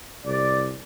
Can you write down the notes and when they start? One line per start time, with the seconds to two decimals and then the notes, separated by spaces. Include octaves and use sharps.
0.25 C2 D5